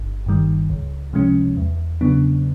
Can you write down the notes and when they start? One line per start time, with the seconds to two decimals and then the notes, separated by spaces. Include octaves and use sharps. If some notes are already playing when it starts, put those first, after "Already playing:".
Already playing: G1
0.26 G2 D#3 G3
0.70 C#2
1.13 C3 F3 G#3 C#4
1.57 E2
2.01 C#3 F#3 B3 D4